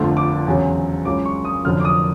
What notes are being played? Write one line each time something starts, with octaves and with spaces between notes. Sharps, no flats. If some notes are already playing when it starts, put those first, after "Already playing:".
Already playing: G1 F2 D3 F3 A3
D6
E2 C#3 F#3
C#2 C#3 F#3 D6
C#6
D#6
F1 F2 D3 F#3 F6
D6
D#6